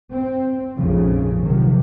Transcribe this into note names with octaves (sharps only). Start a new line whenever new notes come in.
C4
A#1 F2 G#2 C#3 F3
C3 D#3 F3 F#3